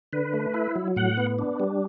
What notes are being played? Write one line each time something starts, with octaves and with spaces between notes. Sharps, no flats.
D3 B4
A3
E4
F#3
A2 F#5
B3
D4
G3